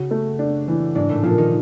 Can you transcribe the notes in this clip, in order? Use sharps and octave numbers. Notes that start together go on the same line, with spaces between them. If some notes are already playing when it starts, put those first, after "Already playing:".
Already playing: C#3 C#4 F#4
A3
D4
E3
G#2 G#3 D4
A2 A3
A#2 F3 A#3
D#3 D#4